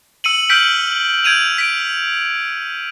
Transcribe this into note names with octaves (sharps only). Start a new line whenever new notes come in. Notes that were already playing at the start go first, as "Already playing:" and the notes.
E6 C#7 D#7 F#7
E6 F6 G6 B6 D7 F#7
G6 G#6 D7 D#7 F7
B6 D7